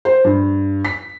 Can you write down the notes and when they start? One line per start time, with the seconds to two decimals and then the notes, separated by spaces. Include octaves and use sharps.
0.05 C5
0.24 G2
0.85 B6